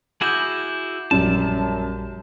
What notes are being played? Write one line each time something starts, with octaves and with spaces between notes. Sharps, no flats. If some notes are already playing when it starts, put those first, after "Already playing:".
E4 F#4 G#4 D6 G6
A#1 F#2 G3 A5